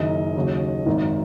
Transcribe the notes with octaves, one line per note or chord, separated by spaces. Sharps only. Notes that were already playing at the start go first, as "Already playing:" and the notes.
Already playing: F#1 F#2 D#3 D#5
D#2 C#3 F#3
G#1 F#2 D#3